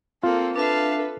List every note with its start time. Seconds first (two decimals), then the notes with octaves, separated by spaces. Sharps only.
0.23 A#3 C4 F4 A4
0.56 D4 A4 B4 E5 F5 A5